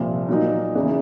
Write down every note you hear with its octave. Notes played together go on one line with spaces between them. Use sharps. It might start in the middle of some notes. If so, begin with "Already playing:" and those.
Already playing: C2 A#2 F3
A#2 F#3 A#3 D#4
E2 C#3 E3